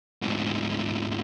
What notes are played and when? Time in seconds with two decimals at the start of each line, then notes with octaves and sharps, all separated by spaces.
0.22 D2 G#2